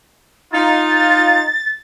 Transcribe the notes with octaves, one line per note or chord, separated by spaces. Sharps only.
D#4 F4 A6